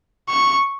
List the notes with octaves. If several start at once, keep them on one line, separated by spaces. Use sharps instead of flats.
C#6